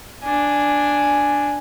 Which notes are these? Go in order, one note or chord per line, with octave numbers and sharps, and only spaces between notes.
D4 G#5